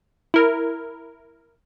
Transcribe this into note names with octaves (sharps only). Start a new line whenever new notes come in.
E4 A#4